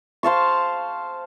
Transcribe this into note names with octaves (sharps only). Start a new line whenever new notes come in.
C5 F5 A5 C#6